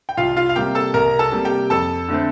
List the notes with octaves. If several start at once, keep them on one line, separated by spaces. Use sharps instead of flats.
G5
C2 F4 F5
F4 F5
F5
C3 G3 A#3 G4 G5
A4 A5
C2 A#4 A#5
A4 A5
C3 G3 A#3
G4 G5
F2 A4 A5
D3 A3 C4